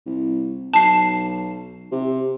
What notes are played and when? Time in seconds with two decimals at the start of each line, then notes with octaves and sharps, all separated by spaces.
0.06 C2
0.74 B1 A5 C7
1.91 C3